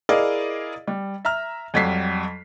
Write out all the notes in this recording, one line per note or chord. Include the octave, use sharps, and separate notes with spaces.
E4 G#4 A#4 D5 D#5 F5
G3
E5 A#5 F6
F2 F#3 G3 B6 C7